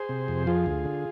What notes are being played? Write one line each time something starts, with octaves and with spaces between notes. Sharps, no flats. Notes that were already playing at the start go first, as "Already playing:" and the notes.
Already playing: G#4 C5
C3
F2
F3 F4 G#4
D2
D3